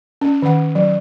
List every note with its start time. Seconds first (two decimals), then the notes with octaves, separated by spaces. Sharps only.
0.21 C#4
0.42 D#3 F#5
0.75 F#3